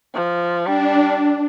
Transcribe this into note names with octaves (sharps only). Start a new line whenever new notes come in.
F3
G3 D4